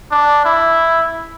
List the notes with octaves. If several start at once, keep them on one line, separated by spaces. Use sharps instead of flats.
D4
E4